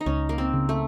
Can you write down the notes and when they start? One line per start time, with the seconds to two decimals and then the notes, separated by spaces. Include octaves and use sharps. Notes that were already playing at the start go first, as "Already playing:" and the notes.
0.01 D#4
0.06 C#2 C#4
0.29 A#3
0.38 C4
0.53 C#3
0.69 A3